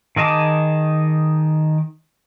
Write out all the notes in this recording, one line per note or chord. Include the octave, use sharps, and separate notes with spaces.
D#3 G#4 D#5 A5 D6